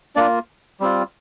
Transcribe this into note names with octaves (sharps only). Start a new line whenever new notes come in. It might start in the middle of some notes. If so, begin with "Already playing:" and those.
A#3 D4 F4 D5
G3 C4 F4